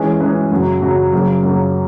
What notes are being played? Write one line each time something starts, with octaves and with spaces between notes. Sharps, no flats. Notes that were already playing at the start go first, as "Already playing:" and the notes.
Already playing: E3 G#3 C#4 G#4 B4
E3 G#3 C#4 G#4 B4
F#2 C#3 F#3
F#2 C#3 F#3
F#2 C#3 F#3 A#3
F#2 C#3 F#3 A#3